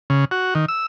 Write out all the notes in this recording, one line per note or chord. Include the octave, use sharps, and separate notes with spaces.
C#3
F#4
D#3
E6